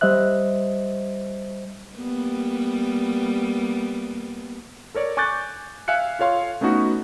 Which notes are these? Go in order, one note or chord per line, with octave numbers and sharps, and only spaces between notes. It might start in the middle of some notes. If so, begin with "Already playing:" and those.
G3 C5 D#5 E5 F#6
G3 A#3 B3
A4 A#4 C#5 D5
G#5 C#6 D6 F#6 G6 A6
E5 F5 G#5 F#6 C#7
F4 A4 C#5 F5 C6
A3 B3 C#4 D#4 F#4